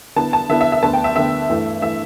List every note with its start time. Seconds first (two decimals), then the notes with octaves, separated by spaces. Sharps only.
0.16 D3 B3 E4 A5
0.33 A5
0.49 D3 B3 E4 E5
0.61 E5
0.72 E5
0.82 D2 D3 B3 A5
0.93 G5
1.04 E5
1.16 D2 D3 B3 E5
1.49 G2 E3 A3
1.82 E3 A3 E5